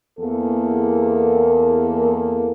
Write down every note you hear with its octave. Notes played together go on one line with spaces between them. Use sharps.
E2 A#3 A4